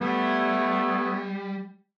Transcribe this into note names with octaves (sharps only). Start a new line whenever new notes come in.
G3 A3 B3 E4